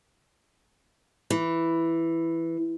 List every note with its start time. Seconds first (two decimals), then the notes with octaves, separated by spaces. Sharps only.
1.30 E3